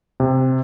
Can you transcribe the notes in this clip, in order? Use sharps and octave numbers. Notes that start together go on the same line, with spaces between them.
C3